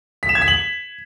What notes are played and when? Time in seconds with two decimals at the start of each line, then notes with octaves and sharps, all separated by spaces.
0.23 B6
0.29 E7
0.35 G#6
0.42 B6
0.48 F#7